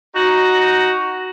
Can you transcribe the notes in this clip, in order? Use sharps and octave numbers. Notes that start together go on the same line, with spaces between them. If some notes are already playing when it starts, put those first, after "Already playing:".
D#4 F#4